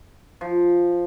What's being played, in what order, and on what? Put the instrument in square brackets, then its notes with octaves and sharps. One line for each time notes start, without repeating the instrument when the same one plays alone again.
[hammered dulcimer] F3